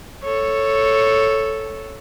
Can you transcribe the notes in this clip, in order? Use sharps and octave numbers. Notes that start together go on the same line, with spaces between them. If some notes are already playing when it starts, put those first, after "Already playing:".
A4 C#5